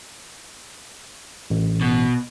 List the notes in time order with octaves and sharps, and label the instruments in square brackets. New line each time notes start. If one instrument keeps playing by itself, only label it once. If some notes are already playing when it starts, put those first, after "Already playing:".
[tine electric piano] A1
[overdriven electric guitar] B2